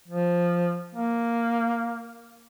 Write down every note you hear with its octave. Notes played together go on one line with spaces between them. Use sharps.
F3
A#3